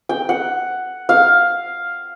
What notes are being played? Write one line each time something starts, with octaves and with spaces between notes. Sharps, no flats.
G5
F#5
F5